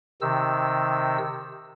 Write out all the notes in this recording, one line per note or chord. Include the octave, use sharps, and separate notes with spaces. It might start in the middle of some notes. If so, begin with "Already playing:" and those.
C3 D#3 E6